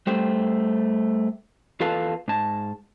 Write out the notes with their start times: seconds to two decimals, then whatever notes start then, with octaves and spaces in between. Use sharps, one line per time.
0.07 G3 A3 C5 G5
1.80 E2 F4 A4 B4 F5 A5
2.28 G#2 A5